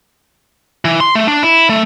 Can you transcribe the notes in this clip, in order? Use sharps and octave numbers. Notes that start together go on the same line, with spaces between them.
E3
C6
A3
D4
E4
A3